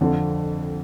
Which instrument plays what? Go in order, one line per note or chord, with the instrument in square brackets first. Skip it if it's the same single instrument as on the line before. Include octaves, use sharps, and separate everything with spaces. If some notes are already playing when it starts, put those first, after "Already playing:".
[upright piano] F2 D3 F3